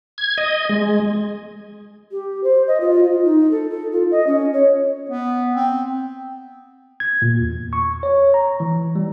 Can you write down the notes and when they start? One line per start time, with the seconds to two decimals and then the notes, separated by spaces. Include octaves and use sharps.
0.18 G#6
0.38 D#5
0.69 G#3
2.10 G4
2.44 C5
2.68 D#5
2.81 F4
3.03 F4
3.25 D#4
3.51 A4
3.71 A4
3.92 F4
4.11 D#5
4.27 C#4
4.53 C#5
5.10 B3
5.55 C4
7.00 G#6
7.22 A#2
7.39 E2
7.73 C#6
8.03 C#5
8.34 A#5
8.60 E3
8.96 G3